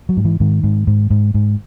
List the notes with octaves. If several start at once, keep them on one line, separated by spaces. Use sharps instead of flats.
F#3
G#2
E3
G#2 D#3
G#2
G#2
G#2
G#2